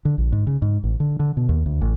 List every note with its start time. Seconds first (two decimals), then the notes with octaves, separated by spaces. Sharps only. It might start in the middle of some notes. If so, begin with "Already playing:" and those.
0.05 D3
0.18 A#1
0.32 G#2
0.47 C#3
0.62 G#2
0.84 A1
1.00 D3
1.20 D3
1.37 B2
1.49 D#2
1.66 D2
1.81 A1